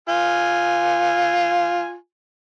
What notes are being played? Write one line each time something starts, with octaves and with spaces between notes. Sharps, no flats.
F4 G#5